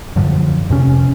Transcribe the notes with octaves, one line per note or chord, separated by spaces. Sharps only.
F#2 A2 D3 F3
F2 C3 C#4